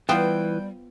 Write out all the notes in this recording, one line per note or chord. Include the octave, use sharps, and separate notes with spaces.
E3 G3 B3 F4 C5 G5